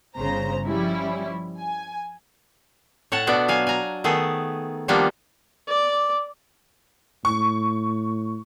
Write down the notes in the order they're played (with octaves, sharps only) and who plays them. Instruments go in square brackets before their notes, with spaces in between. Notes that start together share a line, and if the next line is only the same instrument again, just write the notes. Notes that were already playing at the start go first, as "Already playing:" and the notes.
[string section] G1 C#3 C5 A#5
F3 G3 C#4 E4
G#5
[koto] A2 C#5 F#5 A5
B2 A3 B3 D4 D5
F#3 F5 G#5
G#5 A#5
D#3 A3 B3 G#4
D#3 F3 G3 A#3 B3 D4
[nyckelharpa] D5 D6
[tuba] A2 [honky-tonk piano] C#6